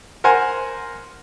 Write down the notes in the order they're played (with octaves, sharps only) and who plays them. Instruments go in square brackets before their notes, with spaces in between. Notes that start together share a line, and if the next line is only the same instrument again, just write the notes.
[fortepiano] A#4 C5 F#5 G#5